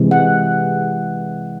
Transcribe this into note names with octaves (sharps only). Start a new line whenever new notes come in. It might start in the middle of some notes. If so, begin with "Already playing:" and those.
Already playing: C3 E3 G#3
F#5